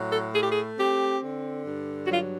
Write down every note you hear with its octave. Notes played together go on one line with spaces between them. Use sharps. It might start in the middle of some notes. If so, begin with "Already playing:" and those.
Already playing: A2 F#3
A4
A3 G#4
G4
G#4
C4 G4
D3
G2
F#4
F#3 F4